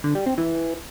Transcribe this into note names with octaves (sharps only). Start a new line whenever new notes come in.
D3
G3
C4
E3